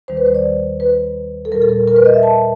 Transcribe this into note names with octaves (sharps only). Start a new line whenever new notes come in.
D#2 D#3 G3 C5
B4
C5
D5
B4
A4
A#2 G3 A#4
A4
A#4
A#4
B4
D#5
E5
A5